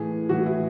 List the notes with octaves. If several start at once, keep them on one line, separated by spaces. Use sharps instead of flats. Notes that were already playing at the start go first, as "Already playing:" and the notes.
Already playing: A2 E3 G#4
A2 E3 F#4
E4